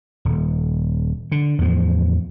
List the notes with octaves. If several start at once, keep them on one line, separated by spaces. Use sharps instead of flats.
D#1
D3
E2 A2 F3